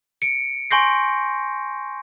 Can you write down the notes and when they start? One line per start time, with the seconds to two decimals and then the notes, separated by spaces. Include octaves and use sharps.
0.22 C#7 D7
0.71 G#5 C6 C#6 G6 A#6 C7